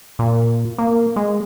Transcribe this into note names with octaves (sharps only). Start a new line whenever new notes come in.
A#2
A#3
G#3